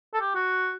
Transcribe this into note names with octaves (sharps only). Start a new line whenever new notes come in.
A4
G4
F#4